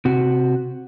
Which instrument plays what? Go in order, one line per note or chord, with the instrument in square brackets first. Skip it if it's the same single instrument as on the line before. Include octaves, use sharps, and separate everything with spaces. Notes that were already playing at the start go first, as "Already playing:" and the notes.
[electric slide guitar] C3 F#4